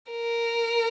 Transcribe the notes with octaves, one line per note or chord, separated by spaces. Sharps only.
A#4